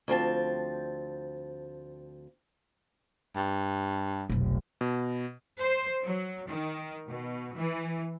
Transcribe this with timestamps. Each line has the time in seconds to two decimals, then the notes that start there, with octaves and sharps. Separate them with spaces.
0.08 D2 F3 C4 A5
3.36 G2
4.29 F1 B1
4.81 B2
5.60 C5
6.04 F#3
6.48 D#3
7.08 B2
7.55 E3